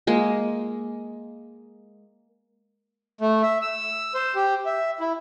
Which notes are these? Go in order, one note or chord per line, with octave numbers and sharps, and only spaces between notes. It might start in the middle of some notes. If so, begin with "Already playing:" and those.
G#3 A#3
A3
E5
E6
C5
G4
E5
E4